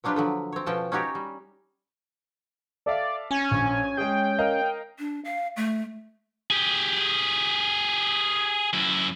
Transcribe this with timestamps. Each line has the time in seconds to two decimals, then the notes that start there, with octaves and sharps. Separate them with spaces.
0.04 F3 F#3 D4 F4 G4 B4
0.16 D3 F3 F#3
0.53 C4 C#5
0.66 B2 F3 C#4 G5 A5
0.92 C#4 D#4 F#4 G4 C#5 D5
1.15 G3
2.86 A4 D5 E5 F5
3.31 C#4 G#5
3.51 A#1
3.97 G#3 G#4 G5
4.39 A#4 D#5 F5
4.99 D4
5.25 F5
5.57 A3
6.50 G4 G#4
8.73 F#2 E4